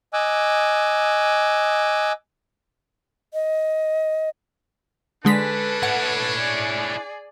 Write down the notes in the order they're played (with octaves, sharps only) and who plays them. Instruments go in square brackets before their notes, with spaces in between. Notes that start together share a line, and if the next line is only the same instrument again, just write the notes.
[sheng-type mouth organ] D#5 G#5 D6 E6 F#6
[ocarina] D#5
[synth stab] D3 G#3 B6 [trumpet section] C#4 D4 [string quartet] A4 B4
[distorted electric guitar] E4 C#5 [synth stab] F#5
[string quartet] G#4 D5